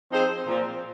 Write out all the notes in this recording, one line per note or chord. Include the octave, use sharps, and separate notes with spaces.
F3 C4 D#4 G#4 C5
A#2 F3 C4